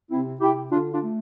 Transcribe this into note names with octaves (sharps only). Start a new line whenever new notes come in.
C3 C4 E4
C3 E4 G4
D3 D4 F4
D4 F4
A3